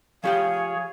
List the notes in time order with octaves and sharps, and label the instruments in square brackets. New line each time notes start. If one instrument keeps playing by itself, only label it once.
[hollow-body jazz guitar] F3 G4 G5 [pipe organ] G#4 C#5 [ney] F5